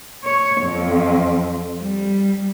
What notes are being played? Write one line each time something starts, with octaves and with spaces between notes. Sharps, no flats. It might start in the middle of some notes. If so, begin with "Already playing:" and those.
C#5
F2
G3